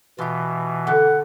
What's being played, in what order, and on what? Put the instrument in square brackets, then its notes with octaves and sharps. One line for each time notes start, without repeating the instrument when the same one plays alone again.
[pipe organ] B2 E3 [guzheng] F4 G4
[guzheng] D3 [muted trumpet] F#5